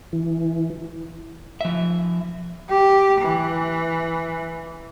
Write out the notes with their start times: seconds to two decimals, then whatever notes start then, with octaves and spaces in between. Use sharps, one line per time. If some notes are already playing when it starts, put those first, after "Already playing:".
0.13 E3
1.61 F3 E5
2.69 G4
3.21 E3